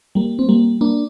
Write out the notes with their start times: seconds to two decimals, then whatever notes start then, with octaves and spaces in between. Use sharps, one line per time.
0.15 G3 A#3
0.39 C4
0.49 G3 A#3
0.81 A#3 D4